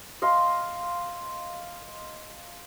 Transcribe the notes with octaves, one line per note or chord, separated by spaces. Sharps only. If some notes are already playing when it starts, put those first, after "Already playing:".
D#5 F5 C6